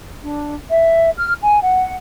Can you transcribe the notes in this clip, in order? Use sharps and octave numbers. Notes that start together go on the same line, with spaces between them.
D4
E5
F6
G#5
F#5